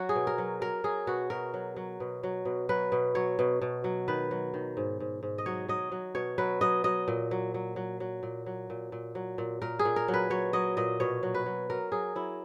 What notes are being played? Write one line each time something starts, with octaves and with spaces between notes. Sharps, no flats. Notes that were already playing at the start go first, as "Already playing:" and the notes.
Already playing: F#3 F#4
G#4
B2
A#4
F#3
F#3 A#4
F#3 G#4
B2 F#4
B2 A#4
F#3
F#3
B2
F#3
B2
F#3 B4
B2
F#3 C#5
B2
B2
F#3
D#3 B4
F#3
D#3
G#2
G#2
G#2
D#5
F#3 C#5
F#3 D#5
F#3
B2 C#5
F#3 B4
F#3 D#5
F#3 D#5
A#2
F#3
F#3
F#3
F#3
A#2
F#3
A#2
A#2
F#3
A#2
A#2 A#4
G#4
A#2
A#4
F#3
B4
F#3 C#5
F#3 D#5
A#2 D#5
B2 C#5
F#3
B4
F#3
F#3 A#4
F#3 G#4
F#3 E4